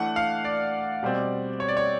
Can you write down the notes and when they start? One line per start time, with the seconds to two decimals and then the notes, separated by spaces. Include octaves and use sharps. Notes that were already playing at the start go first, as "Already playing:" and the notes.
Already playing: E3 A3 D4 F#5
0.16 F5
0.45 D5
1.03 B2 G3 C4
1.60 C#5
1.68 D5
1.77 C#5